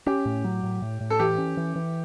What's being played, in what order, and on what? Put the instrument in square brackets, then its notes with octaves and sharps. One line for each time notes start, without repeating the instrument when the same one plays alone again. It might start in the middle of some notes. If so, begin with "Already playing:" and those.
[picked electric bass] C#4 [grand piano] G4
[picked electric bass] A2
F#3
A2
A2
A2
[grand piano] A4
[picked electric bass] E3 [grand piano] G4
[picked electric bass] C#4
E3
E3